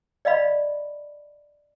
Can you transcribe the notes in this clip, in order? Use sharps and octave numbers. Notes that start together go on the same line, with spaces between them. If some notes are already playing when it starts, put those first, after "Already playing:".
D5 D#5 F5 B5